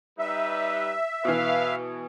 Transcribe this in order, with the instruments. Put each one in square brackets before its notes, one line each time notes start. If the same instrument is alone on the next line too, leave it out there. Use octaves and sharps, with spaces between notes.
[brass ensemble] G3 D#4 B4 [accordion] E5
[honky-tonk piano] B2 E3 [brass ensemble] B4 F5